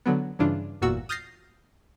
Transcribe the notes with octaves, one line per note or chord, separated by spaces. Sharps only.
D3 F#3 B3
G2 C#3 E3 D4 F4
G1 E2 A#2 F#4 E6
D#6 F6 G6 A6 A#6 C7